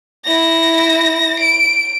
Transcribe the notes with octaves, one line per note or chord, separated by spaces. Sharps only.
E4 A#6
D7